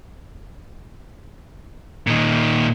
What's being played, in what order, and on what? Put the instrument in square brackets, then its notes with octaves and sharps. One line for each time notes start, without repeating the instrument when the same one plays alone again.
[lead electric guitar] A#2 D#3